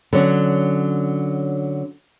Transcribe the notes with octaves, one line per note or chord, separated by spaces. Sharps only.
D3 F#3 C#4